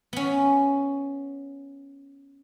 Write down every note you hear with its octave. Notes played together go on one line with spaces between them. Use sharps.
B3 C#4